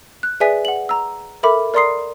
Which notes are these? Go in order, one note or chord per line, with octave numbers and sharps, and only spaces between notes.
F#6
G#4 B4 D5 E5 G#5 B6
F#5 F#7
A#5 E6
A4 A#4 E5 B5 D6
A#4 D5 A#5 C6 D#6 C7